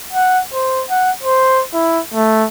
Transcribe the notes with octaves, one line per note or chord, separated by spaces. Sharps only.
F#5
C5
F#5
C5
E4
A3